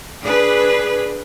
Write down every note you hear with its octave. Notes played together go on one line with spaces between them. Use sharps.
D4 G#4 B4